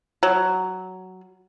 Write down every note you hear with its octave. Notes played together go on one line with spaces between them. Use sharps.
F#3